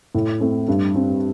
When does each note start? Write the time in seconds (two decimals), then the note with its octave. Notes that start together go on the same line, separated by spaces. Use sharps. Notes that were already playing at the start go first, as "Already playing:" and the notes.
0.15 A2
0.40 A3 C4
0.68 G2
0.94 G3 C4